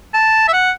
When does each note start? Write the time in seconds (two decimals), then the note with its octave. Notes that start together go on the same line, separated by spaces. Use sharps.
0.14 A5
0.48 E5
0.53 F#5